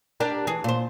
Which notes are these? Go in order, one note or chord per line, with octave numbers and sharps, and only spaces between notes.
D4 G4 A#4
E3 G#4
A#2 C5